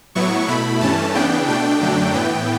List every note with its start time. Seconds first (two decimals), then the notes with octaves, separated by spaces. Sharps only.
0.15 A2 F#3 B3 E4 C#6
0.48 B2 A3 E4 B5
0.81 G2 E3 A3 C#4 A5
1.14 C#3 E3 B3 D4 G5
1.48 B2 A3 D4 G5
1.81 F#2 D3 F#3 A3 D4
2.14 A2 E3 B3 G5